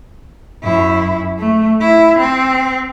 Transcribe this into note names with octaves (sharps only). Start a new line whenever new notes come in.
F#2 E4
A3
E4
C4